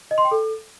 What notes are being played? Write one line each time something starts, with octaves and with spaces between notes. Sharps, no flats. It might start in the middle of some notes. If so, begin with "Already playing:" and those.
D#5
C6
G5
A4